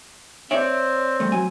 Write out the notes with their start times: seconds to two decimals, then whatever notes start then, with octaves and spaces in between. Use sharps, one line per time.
0.51 C4 C#5 D5 E5
1.20 G3 A3
1.32 F#3 G#5